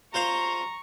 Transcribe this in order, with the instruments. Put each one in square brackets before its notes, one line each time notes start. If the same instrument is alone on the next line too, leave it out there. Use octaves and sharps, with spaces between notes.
[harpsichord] F4 C5 F5 [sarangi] A#5 [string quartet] C#6